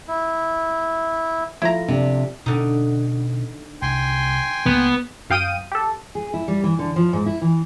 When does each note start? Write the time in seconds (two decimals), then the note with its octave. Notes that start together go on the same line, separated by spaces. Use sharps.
0.08 E4
1.62 F3 A3 E4 F4 A#5
1.88 C3 D4
2.46 B2 D3 C#4 D#4
3.82 C2 G5 G#5 C6
4.66 C#2 A#3 B3
5.30 F#2 F5 G5 D#6 D#7
5.72 G4 A4
6.15 G#4
6.33 E4
6.48 G3
6.64 E3
6.79 D3
6.96 F3
7.13 G#2
7.26 E4
7.41 E3